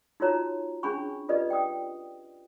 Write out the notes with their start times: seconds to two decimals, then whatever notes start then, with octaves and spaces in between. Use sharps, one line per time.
0.20 D#4 F4 F#4 C#5 A#5
0.83 C#4 D4 G#4 G#5 B5 C#6
1.29 F4 G4 A4 B4 D5 D#5
1.50 G5 D#6